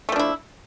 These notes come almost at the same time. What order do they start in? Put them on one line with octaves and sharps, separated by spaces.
A3 F3 D4 E4